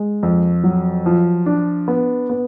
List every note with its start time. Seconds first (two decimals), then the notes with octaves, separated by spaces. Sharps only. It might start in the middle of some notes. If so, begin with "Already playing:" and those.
Already playing: G#3
0.23 F2
0.64 F#3
1.06 F3
1.46 D4
1.88 B3
2.30 B3